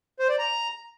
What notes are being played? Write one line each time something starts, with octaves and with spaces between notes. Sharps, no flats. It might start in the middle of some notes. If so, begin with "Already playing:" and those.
C5
D5
A#5